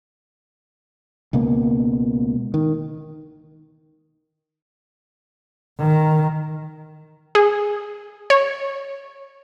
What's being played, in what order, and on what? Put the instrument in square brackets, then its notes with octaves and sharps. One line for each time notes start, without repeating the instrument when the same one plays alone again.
[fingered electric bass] C#2 B2 A#3
D#3
[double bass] D#3
[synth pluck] G#4
C#5